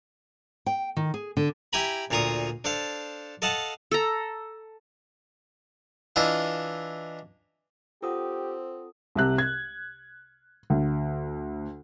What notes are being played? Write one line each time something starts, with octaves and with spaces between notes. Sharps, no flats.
G5
D#3
G#4
D3
E4 G4 G5 G#5 A#5 B5
D2 A#2 F4 A#5 C#6 D#6
D4 A4 C5 F5
A4 D#5 F5 F#5 A5
A4 A#5
E3 D4 E4 F4 D#5
C4 F4 G4 A4 F#5 D#6
C2 C3 F#6
G#6
D2